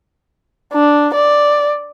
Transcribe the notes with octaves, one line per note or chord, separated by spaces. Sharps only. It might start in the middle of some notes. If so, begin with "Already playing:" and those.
D4
D5